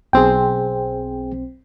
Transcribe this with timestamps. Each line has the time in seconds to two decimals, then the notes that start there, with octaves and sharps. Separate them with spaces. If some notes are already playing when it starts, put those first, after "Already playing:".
0.13 B1 C4 G#4 G5